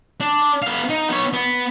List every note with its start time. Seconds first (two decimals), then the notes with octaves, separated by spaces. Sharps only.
0.20 D4
0.62 B3 F5
0.89 D#4
1.09 B3 C#5
1.33 B3